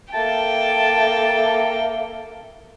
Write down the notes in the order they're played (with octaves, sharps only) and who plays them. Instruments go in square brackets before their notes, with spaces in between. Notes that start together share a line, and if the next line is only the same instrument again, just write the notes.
[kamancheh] A#3 A4 [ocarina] E5 [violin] G5 [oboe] A5